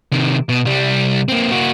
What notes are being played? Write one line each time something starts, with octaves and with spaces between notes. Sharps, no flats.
C3 D#3
B2
C2 G3
A#3 C4
A#3 F#4